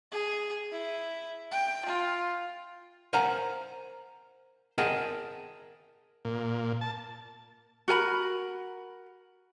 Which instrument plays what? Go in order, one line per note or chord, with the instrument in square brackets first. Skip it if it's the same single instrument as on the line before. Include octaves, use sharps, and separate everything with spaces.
[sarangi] G#4
E4
G5
F4
[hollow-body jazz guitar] A#4 C5 F5 F#5 G#5 A#5
G#4 A#4 D#5 F#5 G5 A5
[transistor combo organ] A#2
A5
[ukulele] F#4 A#4 G#5 B5